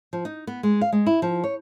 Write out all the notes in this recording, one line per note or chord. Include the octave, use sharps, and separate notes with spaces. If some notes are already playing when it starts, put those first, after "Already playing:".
F3
D#4
B3
G#3
F5
G#3
E4
F3
C#5